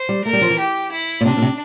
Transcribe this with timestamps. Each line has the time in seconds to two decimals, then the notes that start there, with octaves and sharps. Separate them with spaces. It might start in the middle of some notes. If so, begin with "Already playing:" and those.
Already playing: C5
0.09 G3
0.25 A3 A#4
0.33 G3
0.41 F3
0.50 E3
0.58 G4
0.92 E4
1.21 A#2
1.25 C3 D4
1.37 A#2
1.42 C3